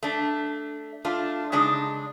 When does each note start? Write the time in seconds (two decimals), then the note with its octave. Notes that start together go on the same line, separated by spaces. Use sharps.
0.03 A3 D4
1.05 A3 D4 F4
1.52 C#3 G#3 D4 D#4